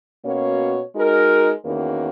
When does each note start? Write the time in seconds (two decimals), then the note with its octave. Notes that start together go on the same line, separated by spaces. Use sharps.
0.24 B2 A#3 C#4 F#4 C#5
0.94 G#3 D#4 F#4 A#4
1.64 E2 D#3 A#3 C#4 F#4